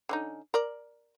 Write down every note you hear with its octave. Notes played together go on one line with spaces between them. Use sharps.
D3 C#4 D#4
A#4 D5